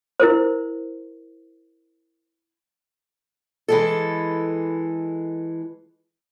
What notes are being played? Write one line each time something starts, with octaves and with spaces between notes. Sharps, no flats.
E4 A#4 C5
E3 G#3 A4